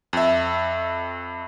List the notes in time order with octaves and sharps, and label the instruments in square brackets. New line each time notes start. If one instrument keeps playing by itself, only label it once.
[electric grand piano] F2 E5